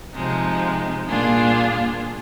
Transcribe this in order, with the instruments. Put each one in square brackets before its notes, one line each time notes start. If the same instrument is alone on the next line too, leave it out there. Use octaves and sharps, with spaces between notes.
[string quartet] C3 F3 G#3 D#4
A#2 G3 D4 F4 G#4